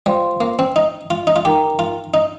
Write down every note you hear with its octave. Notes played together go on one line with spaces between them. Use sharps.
G3 F4 C5 F5 C6
A#3
C4
D#4
F4
D#4
F4
D#4 G4 A#4 G5 A#5
F4
D#4